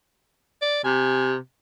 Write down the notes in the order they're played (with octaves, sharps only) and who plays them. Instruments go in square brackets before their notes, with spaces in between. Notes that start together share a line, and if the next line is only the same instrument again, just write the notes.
[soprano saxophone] D5
[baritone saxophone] C3 [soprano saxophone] G#5